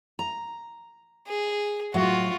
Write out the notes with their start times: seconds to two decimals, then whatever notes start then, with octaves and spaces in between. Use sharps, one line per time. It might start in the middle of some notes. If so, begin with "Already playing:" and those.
0.19 A#5
1.27 G#4
1.94 A2 F#3 F4 F#4